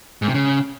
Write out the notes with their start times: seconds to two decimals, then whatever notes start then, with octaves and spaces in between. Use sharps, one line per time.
0.22 G#2
0.28 C3
0.34 C#3